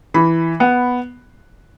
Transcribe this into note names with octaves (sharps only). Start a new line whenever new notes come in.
E3 B5
B3